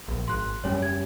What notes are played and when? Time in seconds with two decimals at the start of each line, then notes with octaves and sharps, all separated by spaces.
0.08 A#1
0.28 G#1 C6 F#6
0.64 F#1 G3 C#4 C#5
0.82 G#6